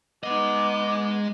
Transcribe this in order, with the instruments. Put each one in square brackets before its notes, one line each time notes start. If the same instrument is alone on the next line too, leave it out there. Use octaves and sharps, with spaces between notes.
[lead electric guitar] G#3 D#5 [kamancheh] B3 D#4 [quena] D6